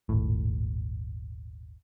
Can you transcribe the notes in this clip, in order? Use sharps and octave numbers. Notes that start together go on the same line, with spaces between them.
D#1 G#1 A2